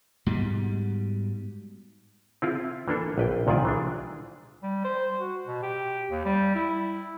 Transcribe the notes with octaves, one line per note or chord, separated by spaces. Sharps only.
G#2 B2 G3
C4 E4 F4 G#4
E3 A#3 D4 A4
A#1 B4 G5
C2 A#2 D#3 F4 D5 G#5
E3 G#3 D4
G3
C5
F#4
B2
G4
D#2
G3
E4